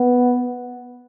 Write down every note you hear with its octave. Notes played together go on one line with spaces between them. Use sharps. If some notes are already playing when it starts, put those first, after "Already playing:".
Already playing: B3